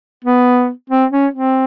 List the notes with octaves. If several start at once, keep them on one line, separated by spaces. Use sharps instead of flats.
B3
C4
C#4
C4